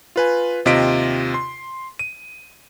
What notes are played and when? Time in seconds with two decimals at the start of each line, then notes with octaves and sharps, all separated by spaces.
0.16 F4 B4 G#5
0.65 D#2 C3 F4 D#5 B6 D7
1.34 C6
1.99 D#7